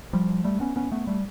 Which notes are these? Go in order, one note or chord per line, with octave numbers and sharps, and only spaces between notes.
F3 G3
G3 A3
B3 C#4
B3 C#4
A3 B3
G3 A3